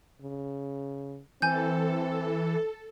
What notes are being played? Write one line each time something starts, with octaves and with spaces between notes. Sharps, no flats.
C#3
E3 C4 A4 G#5 G6